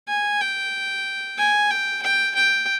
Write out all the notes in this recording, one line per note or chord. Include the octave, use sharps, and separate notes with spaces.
G#5
G5
G#5
G5
G5
G5